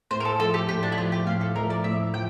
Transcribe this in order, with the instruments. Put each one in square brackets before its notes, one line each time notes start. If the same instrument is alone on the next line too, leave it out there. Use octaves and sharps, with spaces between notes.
[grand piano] A2 [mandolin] C5
[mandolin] A#4
A4
[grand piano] F3 A3 [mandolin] A4
[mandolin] G4
[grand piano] A2 [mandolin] G4
[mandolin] D4
E4
[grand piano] F3 A3 [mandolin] F4
[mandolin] G4
[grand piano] A2 [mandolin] F5
[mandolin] A4
[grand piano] F3 [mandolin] A#4
[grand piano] A3
[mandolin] D5
[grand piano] A2 [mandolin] E5
[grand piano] F3 [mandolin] G5